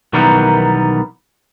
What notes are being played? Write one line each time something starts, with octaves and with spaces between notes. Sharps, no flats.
B1 D#3 E3 G3 B3 A#4